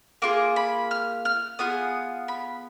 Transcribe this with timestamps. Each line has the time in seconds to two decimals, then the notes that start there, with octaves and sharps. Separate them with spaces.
0.22 A#3 F4 G#4 D6
0.56 B5
0.91 F6
1.25 F6
1.59 B3 F4 G#4 D#6
2.28 B5